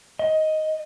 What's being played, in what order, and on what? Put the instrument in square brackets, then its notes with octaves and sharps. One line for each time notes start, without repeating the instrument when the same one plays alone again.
[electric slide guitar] D#5